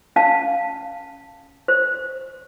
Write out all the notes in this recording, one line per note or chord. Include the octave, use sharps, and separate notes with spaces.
C#4 F5 A5
C5